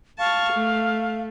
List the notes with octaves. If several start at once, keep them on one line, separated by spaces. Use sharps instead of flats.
F5 A5 C#6
A3